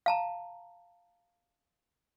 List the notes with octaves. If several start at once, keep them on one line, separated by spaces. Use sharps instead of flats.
F5 A5 A#5